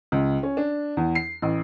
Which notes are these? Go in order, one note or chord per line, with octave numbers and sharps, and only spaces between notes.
C#2
C#4
D4
E2
C7
A1